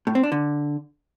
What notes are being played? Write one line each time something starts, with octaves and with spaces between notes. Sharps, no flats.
A2
C4
D4
D3